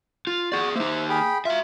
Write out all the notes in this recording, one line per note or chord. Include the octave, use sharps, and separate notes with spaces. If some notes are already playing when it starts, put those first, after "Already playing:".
F4
F#4 G#4 D5
A#3 D#4 C5 E5
G#4 G5 B5
F4 F#4 E5